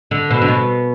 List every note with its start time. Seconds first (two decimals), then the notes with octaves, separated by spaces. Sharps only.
0.11 D3
0.30 B2
0.42 D3
0.48 B2